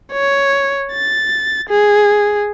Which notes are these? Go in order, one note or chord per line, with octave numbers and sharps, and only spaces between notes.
C#5
A6
G#4